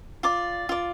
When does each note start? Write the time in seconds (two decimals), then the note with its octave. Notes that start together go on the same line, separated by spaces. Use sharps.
0.23 F4 D5 D6
0.69 F4 D5